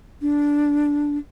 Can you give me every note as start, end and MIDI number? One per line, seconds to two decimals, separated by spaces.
0.22 1.18 62